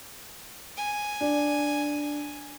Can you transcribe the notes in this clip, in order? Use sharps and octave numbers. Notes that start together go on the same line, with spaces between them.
G#5
D4